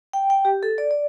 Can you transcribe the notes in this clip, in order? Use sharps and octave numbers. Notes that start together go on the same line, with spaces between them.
G5
G5
G4
A4
D5
D5